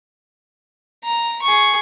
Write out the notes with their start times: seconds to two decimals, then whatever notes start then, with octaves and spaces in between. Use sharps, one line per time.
1.05 A#5
1.42 G#4 C#6